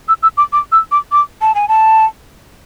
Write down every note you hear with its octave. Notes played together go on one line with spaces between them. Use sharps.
E6
E6
D6
D6
E6
D6
D6
A5
G#5
A5